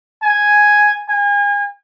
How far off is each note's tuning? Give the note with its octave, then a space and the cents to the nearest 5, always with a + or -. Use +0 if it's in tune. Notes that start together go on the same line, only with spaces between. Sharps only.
G#5 +0
G#5 -35